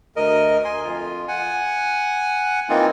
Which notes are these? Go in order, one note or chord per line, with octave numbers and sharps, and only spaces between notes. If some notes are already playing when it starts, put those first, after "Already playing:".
D2 A#4 D#5
G#5 C6
F2 F4
F#5 G#5
E3 A#3 C4 D#4 F4